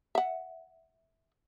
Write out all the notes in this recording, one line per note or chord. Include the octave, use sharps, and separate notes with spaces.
E5 F#5